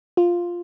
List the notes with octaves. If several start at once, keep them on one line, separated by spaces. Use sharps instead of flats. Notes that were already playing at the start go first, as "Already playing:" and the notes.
F4